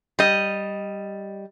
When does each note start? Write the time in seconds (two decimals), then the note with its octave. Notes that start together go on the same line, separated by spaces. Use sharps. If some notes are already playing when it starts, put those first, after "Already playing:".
0.19 G3 D#5